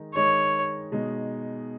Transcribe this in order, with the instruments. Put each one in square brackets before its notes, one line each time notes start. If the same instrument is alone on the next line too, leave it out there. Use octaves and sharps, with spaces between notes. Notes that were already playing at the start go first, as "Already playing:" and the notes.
Already playing: [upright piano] D#3 G#3 D#4
[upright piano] D#3 G#3 D#4 [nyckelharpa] C#5
[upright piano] B2 G#3 D#4